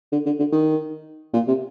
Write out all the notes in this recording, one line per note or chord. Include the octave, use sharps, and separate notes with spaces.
D3
D3
D3
D#3
A#2
C3